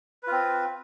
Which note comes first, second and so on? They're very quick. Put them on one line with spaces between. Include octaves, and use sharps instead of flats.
B4 F4 C4